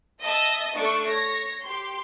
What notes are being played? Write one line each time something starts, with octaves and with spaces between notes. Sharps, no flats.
D#5 E5 A5 D#6
A3 D4 C#6
C#5 A#6
G4 C6